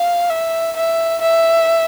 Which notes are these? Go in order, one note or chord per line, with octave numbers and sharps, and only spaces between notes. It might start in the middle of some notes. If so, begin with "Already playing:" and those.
Already playing: F5
E5
E5
E5